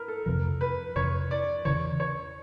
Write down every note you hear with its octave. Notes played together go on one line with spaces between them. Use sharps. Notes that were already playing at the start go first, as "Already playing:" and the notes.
Already playing: A#4 B4
A4
F2 C3 F3 A#4
B4
F2 C3 F3 C#5
D5
E2 C#3 E3 C#5
C#5